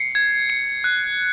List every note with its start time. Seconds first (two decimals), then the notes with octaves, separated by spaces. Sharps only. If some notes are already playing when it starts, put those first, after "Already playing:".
Already playing: C7 C#7
0.15 G#6
0.50 C#7
0.84 F#6